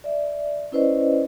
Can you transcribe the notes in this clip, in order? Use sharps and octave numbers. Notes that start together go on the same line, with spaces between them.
D5 E5
C#4 E4 B4 C5 D5 D#5